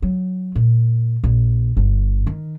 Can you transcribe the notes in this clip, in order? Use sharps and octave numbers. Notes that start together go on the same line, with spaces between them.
F#3
A#2
A#1
G1
D#3